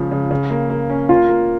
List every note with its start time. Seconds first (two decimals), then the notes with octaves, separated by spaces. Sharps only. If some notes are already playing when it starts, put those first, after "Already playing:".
Already playing: C#2 C#3 F3
0.11 C#3
0.31 C#3
0.50 A#3
0.70 A#3
0.90 C#4
1.09 A#3 F4
1.29 A#3